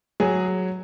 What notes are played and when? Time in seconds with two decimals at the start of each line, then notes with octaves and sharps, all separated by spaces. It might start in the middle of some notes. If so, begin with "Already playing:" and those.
0.20 F#3 G#4